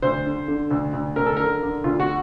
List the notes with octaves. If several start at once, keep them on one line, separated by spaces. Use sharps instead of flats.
D2 C5
D3
D3
D2
D2
D2 A#4
A4
D3 A#4
D3
D2 F4
F#4